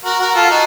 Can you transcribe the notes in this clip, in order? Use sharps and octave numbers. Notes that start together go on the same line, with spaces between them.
F#4 A#4
F#4 A#4
F4 A4
D#4 F#4